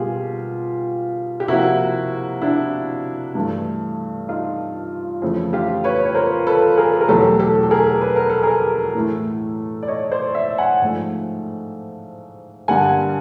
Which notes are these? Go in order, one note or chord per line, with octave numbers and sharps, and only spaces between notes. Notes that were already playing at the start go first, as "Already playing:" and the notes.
Already playing: B2 G3 A#3 F4 G4 G#4
G4
C3 F3 A#3 E4 F#4
D4 E4
G2 E3 A3
D#4 F4
F2 C#3 E3 A3
F4 G4
B4 C#5
C#5
A#4 C5
A4 B4
G#4 A#4
A#4
E2 B2 F#3 A3 G4 A4
G4 A4
A4
G#4 A#4
B4
A#4
A4
G#4 A#4
A2 E3 A3
D5
C#5 D#5
C5 D5
D5 E5
F#5 G#5
G#2 F3 A3
G2 D3 G3 A#3 F#5 G#5